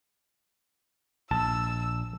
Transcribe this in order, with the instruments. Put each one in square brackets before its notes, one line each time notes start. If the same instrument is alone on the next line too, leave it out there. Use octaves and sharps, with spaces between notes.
[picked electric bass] A#1 [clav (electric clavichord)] A5 [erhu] E6